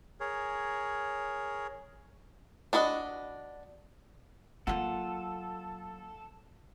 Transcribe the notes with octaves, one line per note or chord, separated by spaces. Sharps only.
G#4 A#4 C#5
D4 F#4 B4 D#5
F#3 A#3 F4 A4 F#5